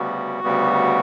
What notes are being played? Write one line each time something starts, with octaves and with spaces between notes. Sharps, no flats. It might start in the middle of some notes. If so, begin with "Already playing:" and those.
Already playing: D2 C#3 G3 B3 F#4
D2 C#3 G3 B3